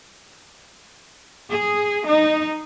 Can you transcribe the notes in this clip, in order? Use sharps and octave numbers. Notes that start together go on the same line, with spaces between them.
G#4
D#4